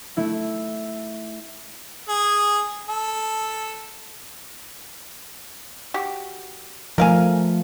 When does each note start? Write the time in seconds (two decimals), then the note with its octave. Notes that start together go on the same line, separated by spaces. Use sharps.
0.17 A3 E4 E5
2.08 G#4
2.89 A4
5.94 F#4 G4
6.98 F3 A3 A#4 F5 G#5